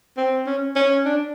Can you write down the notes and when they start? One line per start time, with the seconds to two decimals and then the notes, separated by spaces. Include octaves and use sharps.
0.17 C4
0.46 C#4
0.76 C#4
1.06 D4